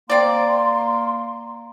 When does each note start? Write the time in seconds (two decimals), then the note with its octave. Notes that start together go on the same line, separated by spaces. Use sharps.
0.10 A#3 C4 D5 C6